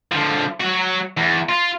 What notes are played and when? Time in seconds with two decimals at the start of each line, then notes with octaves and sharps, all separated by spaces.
0.12 D3 F3
0.60 F#3 F#4
1.17 E2
1.49 F4